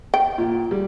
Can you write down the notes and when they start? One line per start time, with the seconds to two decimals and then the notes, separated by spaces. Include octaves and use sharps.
0.14 G5
0.38 A#2
0.71 G3